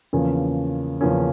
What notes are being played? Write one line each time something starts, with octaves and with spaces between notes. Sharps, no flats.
E2 C#3 F3 A#3 C#4
E2 C#3 F3 A#3 C#4